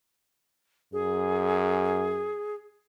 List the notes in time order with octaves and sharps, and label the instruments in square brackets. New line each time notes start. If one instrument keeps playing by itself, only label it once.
[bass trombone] F#2 [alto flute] G#4